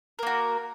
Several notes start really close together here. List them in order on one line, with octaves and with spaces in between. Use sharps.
A#4 A#3 F#4